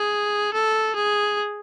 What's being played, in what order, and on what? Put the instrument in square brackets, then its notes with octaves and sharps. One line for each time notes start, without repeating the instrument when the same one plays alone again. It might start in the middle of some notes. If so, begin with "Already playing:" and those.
Already playing: [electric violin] G#4
A4
G#4